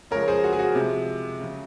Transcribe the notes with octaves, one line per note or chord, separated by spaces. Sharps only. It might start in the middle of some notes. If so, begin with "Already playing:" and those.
C#3 F3 G#3 A#4 C#5
G#4 C5
F#4
G#4
F#4
C3 F3 G#3
C#3 F#3